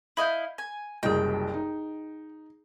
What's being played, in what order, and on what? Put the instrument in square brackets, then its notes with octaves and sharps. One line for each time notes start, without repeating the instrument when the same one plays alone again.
[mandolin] E4 D#5 F5 [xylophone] B5 G6
[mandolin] G#5
[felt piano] F#1 C2 F#2 [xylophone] G#4 D#5 [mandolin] G5
[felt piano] D#4